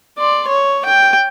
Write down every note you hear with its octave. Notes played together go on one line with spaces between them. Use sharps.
D5 C6
C#5
G5